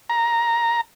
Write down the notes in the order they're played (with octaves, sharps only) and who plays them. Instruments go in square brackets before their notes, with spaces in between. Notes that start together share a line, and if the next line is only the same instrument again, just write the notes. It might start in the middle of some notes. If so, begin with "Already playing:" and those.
[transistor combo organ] A#5